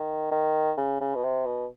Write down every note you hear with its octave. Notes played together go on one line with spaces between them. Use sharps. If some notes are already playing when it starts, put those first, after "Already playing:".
Already playing: D#3
D#3
C#3
C#3
B2
C3
B2